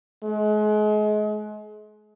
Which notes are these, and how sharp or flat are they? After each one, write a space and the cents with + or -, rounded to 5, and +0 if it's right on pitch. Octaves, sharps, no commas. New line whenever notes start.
G#3 +35